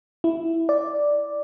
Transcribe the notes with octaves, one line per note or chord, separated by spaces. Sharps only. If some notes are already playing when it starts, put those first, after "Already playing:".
E4
D5